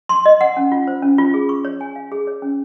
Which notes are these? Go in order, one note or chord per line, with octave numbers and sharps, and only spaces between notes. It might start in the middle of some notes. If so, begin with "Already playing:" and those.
C6
D#5
F#5
C#4
F4
C5
C#4
F4
G#4
C#6
C#5
G#5
F5
G#4
C#5
C#4